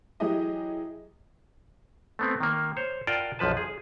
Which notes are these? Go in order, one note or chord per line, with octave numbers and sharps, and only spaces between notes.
E3 F#3 E4 G4 G#4 D#5
A3 B3 C4
D#3 A#3
C5 C#5
F4 A#4 D5 F#5 G5 A5
B1 F#2 F3 B4 A5
G#4